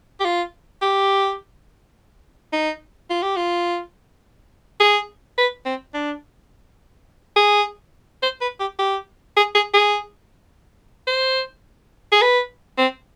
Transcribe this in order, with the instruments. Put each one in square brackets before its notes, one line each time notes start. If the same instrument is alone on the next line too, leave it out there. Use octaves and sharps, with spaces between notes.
[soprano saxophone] G4
F4
G4
D#4
F4
G4
F4
G#4
B4
C4
D4
G#4
C5
B4
G4
G4
G#4
G#4
G#4
C5
G#4
B4
C4